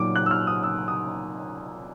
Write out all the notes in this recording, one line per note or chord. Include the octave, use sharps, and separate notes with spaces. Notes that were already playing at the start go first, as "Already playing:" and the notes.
Already playing: A#2 F#3 D#4 D6
F#6
E6
F6
D#6
E6
D#6